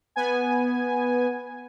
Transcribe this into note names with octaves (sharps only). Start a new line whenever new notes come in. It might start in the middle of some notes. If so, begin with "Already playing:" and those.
B3 G#5